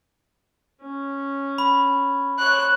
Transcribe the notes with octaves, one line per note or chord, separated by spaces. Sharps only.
C#4
B5
C5 C#5 F#6